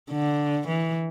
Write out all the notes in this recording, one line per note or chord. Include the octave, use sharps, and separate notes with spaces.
D3
E3